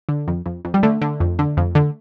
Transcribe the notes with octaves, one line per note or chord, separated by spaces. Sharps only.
D3
F2
F2
F2
G3
D3 A3
D3
F2
D3
F2
D3